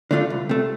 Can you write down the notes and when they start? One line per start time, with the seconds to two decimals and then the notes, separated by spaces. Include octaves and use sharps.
0.11 D3 A3 D4 F4
0.30 C2
0.49 C3 A3